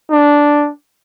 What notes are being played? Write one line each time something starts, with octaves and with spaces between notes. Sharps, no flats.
D4